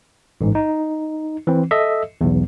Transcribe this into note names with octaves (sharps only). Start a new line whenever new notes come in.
A1 G#2
D#4
E3 C4
A4 D#5 E5
B1 E2